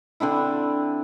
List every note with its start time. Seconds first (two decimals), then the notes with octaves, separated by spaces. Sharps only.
0.20 D3 C4 D4 E4